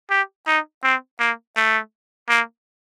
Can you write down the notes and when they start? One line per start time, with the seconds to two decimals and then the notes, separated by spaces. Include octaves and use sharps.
0.10 G4
0.47 D#4
0.83 C4
1.20 A#3
1.56 A3
2.29 A#3